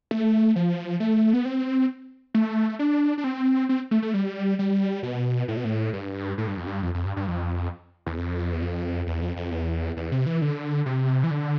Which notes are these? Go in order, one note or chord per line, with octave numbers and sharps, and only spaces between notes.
A3
F3
A3
B3
C4
A3
D4
D4
C4
C4
A3
A3
G3
G3
B2
A2
B2
A2
G2
A2
G2
F2
G2
F2
F2
G2
G2
F2
E2
F2
E2
F2
E2
F2
F2
E2
E2
C3
E3
D3
C3
E3
D3